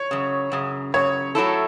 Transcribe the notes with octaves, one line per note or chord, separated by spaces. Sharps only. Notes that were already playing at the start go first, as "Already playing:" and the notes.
Already playing: C#5
F#2 C#3
F#2 C#3
F#2 C#3 C#5
A2 F#3 A3 E4 A4